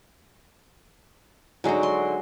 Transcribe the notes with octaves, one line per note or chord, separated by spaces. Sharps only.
D3 F#3 G#3 D#4 F#4
C6